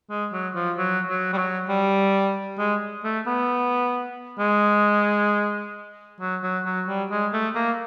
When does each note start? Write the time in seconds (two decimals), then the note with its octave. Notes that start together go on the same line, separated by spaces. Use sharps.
0.10 G#3
0.33 F#3
0.55 F3
0.78 F#3
1.08 F#3
1.33 G3
1.38 F#3
1.69 G3
2.59 G#3
3.04 A3
3.27 B3
4.39 G#3
6.20 F#3
6.43 F#3
6.65 F#3
6.88 G3
7.11 G#3
7.33 A3
7.55 A#3